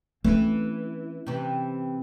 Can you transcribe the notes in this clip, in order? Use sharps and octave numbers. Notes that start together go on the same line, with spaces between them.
E3 A3 C4 C#4
C3 E3